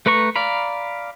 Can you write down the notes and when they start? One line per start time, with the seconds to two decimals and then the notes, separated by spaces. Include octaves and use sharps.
0.06 A3 B4 A#5 C#6
0.36 D5 F5 A#5 B5